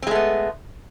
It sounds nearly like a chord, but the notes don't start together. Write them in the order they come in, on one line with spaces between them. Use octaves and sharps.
C4 G#3 A3 B3